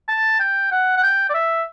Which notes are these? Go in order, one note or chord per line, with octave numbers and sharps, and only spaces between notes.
A5
G5
F#5
F#5
G5
D5
E5